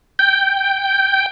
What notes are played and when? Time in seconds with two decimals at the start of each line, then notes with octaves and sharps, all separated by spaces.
0.19 G5